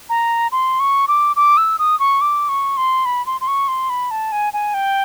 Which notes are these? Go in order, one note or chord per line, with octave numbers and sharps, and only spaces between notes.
A#5
C6
C#6
D6
D6
E6
D#6
C#6
D6
C#6
C6
B5
C6
C6
C#6
C6
B5
A5
G#5
G#5
G5